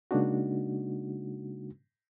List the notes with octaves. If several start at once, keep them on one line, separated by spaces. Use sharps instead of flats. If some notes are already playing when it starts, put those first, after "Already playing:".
C#3 G#3 A#3 D4 D#4 F#4